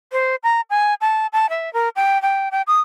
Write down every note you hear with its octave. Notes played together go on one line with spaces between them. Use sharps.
C5
A#5
G#5
A5
A5
E5
A#4
G5
G5
G5
D#6